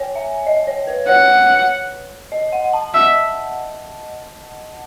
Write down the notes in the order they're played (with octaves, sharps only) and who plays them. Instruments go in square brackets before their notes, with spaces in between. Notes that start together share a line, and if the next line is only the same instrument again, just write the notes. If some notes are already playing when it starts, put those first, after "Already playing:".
Already playing: [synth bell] C#5 G#5
E5
D#5
C#5
B4
[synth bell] C#5 [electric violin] F#5
[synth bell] D#5
F#5
A5
[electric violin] E5